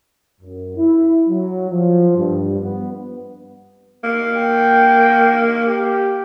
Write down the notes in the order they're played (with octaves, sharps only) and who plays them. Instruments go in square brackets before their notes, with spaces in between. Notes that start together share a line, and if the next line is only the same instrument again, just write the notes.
[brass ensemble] F#2
E4
F#3
F3
G2
B3
[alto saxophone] A#3
[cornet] G5
G4